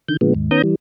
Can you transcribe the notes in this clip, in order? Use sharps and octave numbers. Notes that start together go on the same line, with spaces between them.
D3 D#3 G6
A#2 D3 F3 G#3 B3
D#2 G#2
D#3 B3 C#4 A#5 D#6 G6
E3 G3